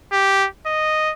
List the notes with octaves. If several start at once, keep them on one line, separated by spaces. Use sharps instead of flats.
G4
D#5